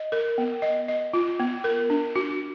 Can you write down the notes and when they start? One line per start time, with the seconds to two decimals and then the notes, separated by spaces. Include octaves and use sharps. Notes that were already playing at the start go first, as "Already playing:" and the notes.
Already playing: D#5
0.12 A#4
0.38 B3
0.62 D#5
0.88 D#5
1.14 F4
1.40 B3
1.64 A#4
1.90 D4
2.16 F#4